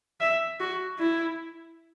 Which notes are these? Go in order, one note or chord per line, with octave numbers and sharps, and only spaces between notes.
E5
F#4
E4